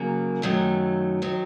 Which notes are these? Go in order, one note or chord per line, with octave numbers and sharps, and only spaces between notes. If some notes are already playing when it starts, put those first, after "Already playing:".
Already playing: F#2 C#3 F#3 A#3
F#2 D#3 F#3 A3
D#3 F#3